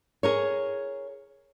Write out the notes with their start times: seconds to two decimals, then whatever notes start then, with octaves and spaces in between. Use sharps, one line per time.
0.23 G#4 A#4 C#5